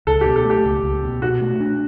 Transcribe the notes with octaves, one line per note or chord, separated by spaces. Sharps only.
C#2 A4
B2 G4
A4
A3
G4
C#2
C#2
B2
B2 F#4
A3
D4